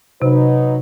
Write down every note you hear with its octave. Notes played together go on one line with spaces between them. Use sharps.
C3 F#3 D#4 B4